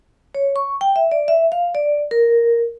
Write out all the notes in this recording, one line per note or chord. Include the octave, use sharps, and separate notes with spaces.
C#5
C#6
G5
E5
D5
E5
F5
D5
A#4